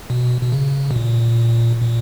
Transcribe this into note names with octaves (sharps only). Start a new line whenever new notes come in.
B2
B2
C#3
B2
A#2
A#2